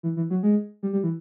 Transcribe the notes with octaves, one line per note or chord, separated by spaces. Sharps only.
E3
E3
F#3
G#3
G3
G3
E3